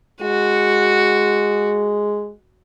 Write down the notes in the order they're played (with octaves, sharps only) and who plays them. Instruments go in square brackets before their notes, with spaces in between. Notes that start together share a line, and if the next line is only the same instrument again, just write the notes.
[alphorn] G#3 [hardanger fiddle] F#4